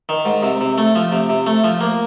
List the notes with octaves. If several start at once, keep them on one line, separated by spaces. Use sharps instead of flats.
D#3
G#2
C3
C3
A3
F3
C3
C3
A3
F3
A#3